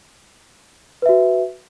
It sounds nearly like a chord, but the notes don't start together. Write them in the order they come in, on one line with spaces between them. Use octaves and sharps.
B4 E5 F#4